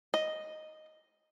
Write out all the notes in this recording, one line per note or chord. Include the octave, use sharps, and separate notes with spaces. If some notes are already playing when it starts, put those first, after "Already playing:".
D#5